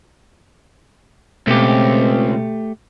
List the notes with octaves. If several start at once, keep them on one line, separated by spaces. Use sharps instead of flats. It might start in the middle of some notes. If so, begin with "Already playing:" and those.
C#2 B2 A3 C4 G4